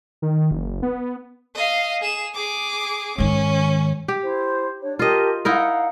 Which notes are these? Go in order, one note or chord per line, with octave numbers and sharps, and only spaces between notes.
D#3
F#1
B3
D#5 F5
G#4 E7
G#4 D6
G#2 D#3 C#4
G4
E4 C5
D4 C#5
F4 G4 A#4 D#5 A5
D#4 E4 A#4 F5 F#5